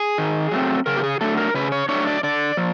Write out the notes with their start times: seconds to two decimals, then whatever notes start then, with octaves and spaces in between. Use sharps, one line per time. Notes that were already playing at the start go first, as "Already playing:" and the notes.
Already playing: G#4
0.18 D#3
0.52 F#3 A3 C4
0.86 C#3 A#4
0.96 G4
1.04 G#4
1.21 F#3 A3 D4 A4
1.37 A#4
1.54 C#3 B4
1.72 C#5
1.89 F#3 A3 D4 C#5
2.07 D5
2.23 D3 D5
2.57 F3